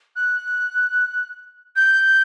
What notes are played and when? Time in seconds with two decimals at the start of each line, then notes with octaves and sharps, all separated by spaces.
0.16 F#6
1.76 G6